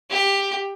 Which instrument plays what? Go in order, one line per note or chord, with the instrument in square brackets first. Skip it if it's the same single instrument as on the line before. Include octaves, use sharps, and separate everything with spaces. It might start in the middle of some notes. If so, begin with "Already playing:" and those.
[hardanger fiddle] G4